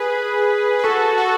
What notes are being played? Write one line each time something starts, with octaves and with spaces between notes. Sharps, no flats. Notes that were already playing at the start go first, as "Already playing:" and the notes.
Already playing: G#4 B4
B4
F#4 A4
F#4 A4